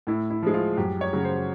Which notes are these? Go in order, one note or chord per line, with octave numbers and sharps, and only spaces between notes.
A2 E4
E4
F3 G#3
F4
F#2 G4
C#5
C#3 F#3
C5